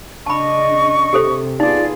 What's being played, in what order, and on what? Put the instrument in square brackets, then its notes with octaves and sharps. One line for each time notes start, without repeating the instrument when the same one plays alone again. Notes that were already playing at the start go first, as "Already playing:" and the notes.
[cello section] C#3 D4 D#5 [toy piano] A5 B5 [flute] C#6
[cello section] C3 [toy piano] G4 A4 C5
[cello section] B3 F4 G#4 [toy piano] D#4 [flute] D5